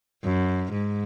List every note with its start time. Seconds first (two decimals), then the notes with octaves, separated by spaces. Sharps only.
0.23 F#2
0.73 G#2